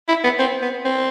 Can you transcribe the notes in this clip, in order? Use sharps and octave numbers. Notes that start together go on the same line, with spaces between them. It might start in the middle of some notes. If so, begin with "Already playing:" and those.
E4
B3
C4
B3
C4